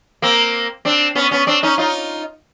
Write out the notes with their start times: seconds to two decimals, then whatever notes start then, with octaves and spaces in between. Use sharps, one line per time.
0.22 A#3 C4
0.85 C4 D4
1.15 B3 C#4
1.31 B3 C#4
1.47 C4 D4
1.63 C#4 D#4
1.78 D#4 F4